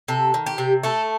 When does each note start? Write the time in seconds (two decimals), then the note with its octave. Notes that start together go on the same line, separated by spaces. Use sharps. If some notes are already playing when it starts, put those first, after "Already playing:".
0.08 C3 A4
0.34 D#3
0.46 G4
0.58 C3
0.83 A3 A4